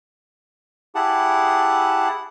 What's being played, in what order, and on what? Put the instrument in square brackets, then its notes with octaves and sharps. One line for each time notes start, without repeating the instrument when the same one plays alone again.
[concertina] E4 G4 G#4 F#5 A5